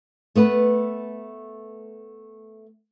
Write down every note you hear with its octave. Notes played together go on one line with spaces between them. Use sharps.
A3 B3 B4